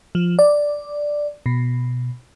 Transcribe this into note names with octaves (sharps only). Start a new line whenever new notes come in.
F3
D5
B2